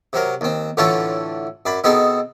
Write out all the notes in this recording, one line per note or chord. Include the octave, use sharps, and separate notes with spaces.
C3 F#3 A#4
D#2 C4
A2 D3 E3 C#4 F4 A4
F#2 D5 B5
B2 B3 C4 D#4 G#4 A4